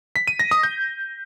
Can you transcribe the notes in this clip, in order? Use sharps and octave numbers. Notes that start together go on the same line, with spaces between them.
B6
D#7
A#6
D#6
G6